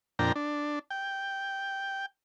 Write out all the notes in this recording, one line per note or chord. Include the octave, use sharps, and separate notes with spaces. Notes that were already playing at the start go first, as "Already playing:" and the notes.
F2 A#2 D4 G5 A#5
D4
G5